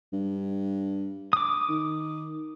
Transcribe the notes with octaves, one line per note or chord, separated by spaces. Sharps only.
G2
D6 D#6
D#3